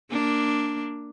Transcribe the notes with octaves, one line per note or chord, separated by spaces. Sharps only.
A#3 D4